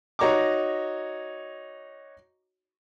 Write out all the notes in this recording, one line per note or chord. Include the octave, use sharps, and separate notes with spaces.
D#4 F#4 C#5 A#5 C#6 D6